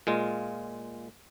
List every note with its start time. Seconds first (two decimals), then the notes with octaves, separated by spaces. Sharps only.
0.07 A#2 G#3 F4